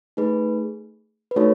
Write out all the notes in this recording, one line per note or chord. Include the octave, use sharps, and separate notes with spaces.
A3 D#4 G#4 B4
B4
A3 D#4 F#4 A4 C#5